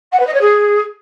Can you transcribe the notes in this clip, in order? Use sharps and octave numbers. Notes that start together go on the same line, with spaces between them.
F#5
B4
D#5
C#5
G#4